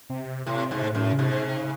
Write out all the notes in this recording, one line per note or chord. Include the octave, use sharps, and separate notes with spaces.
C3
A2 C3
G#2 C3
A2
F#2
C#3
G#2 C3
C#3